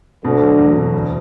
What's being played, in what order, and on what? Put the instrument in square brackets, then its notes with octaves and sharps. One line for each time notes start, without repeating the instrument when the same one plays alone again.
[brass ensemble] D2 D3 [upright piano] B2
[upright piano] F#3
E2
B2
D2